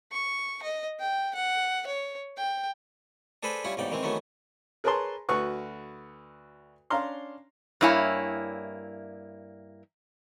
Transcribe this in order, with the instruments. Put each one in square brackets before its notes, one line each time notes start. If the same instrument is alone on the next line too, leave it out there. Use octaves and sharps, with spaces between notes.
[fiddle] C#6
D#5
G5
F#5
C#5
G5
[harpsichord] D4 G#4 A4 B4 C5 B5
G3 C#4 E4 F4 F#5
A1 E2 G#2 C#3 D5 G5
D#3 E3 G#3 C4
D#3 E3 F#3 A3 B3 C#4
[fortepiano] G#4 A#4 B4 C#5 A5 C6
D2 F#4 B4 C#6
C#4 D4 F5 A#5 C6
[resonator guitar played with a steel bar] G2 A#3 E4 C#5 G#5